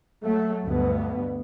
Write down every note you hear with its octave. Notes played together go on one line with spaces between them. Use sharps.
F#3 A3
D2 G2 B2 B3